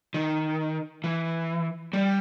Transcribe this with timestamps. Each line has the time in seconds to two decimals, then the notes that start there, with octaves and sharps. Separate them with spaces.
0.14 D#3
1.04 E3
1.93 G3